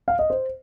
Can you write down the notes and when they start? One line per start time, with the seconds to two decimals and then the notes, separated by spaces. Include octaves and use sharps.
0.08 F5
0.19 D#5
0.30 C5